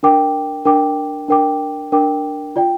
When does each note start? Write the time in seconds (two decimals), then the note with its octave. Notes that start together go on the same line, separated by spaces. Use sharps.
0.03 D4 A#4 G5 D6
0.65 D4 A#4 G5 D6
1.28 D4 A#4 G5 D6
1.92 D4 A#4 G5 D6
2.56 F4 D5 G5